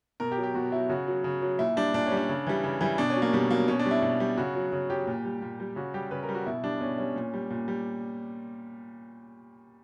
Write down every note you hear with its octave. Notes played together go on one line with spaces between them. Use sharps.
B2 A#4
G4
F#3
G4
B2 F#4
F#3 E4
C#3 F#4
F#3
C#3
F#3
A#2 E4
G3 D4
A#2 D4
C#4
G3
D4
C#3
E3 G3
C#3
E3 G3
B2 D4
C#4
F#3
A#3
B2 G3
F#3 A#3
B2 C#4
D4
G3
E4
B2
G3
C#3 F#4
F#3
C#3
F#3 G4
A#2
G3
A#2
G3
C#3 F#4
G3 G4
C#3 B4
A#4
G3
F#4
B2 E4
G3 D4
B2 C#4
G3 C#4
A#2
G3
A#2
G3